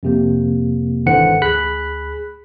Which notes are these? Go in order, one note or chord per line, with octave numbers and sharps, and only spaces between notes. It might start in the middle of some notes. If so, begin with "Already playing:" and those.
F2 C3 A#3
G#1 D3 E3 C5 F#5 C#7
D2 G#4 B5 F#6 B6